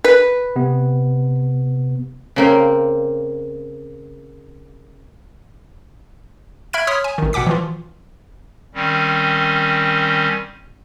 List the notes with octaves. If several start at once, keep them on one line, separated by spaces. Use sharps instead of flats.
B4
C3 B3
C#3 A#3 C4
E5 B5 F6 G#6 D7
C#5 C6 D#6 F6 B6
G#5
A1 D#3
B2 F#5 G5 D6 B6
E3 F3 F4
D#3 G3 C4 C#4